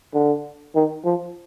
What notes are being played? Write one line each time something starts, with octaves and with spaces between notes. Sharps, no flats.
D3
D#3
F3